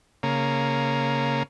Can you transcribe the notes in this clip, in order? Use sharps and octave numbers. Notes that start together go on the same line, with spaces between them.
C#3 A#3